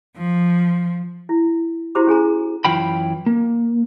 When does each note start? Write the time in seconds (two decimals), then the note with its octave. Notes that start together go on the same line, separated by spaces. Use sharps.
0.17 F3
1.29 E4
1.95 E4 F#4 G4 C5 A#5 D6
2.07 C#4 G#4 G#5 A#5
2.65 F#2 E3 F4 G5 B5
3.26 A#3